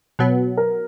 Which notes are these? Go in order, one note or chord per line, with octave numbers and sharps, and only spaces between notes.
B2 F#3 B3
A#4